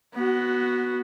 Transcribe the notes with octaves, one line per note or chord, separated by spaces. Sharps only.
B3 F#4